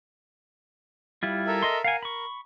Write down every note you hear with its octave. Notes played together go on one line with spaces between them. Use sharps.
G3 E4 F4
A4 A#4 E5
D#5 C6
A#4 F5 F#5 G#5
B5 C#6